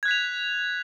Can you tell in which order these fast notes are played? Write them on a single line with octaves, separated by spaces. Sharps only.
G#6 F#6 B6 F7